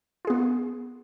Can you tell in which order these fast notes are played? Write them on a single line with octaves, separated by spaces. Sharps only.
F4 G#4 B3